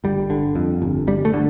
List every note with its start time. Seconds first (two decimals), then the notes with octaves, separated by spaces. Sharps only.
0.04 G1 G3
0.30 D3
0.56 F2
0.82 G1
1.07 G1 G3
1.25 A3
1.34 D3